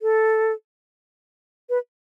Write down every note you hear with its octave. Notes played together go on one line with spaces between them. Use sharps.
A4
B4